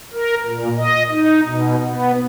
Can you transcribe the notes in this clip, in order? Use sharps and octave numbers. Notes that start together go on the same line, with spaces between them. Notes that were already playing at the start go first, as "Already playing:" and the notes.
A#4
A#2
D#5
D#4
B2
B3